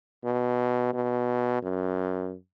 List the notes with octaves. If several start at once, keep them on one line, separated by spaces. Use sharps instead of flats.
B2
B2
F#2